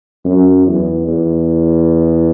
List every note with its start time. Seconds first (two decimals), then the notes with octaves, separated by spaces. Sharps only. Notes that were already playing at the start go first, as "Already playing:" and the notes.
0.25 F#2
0.67 E2
1.08 E2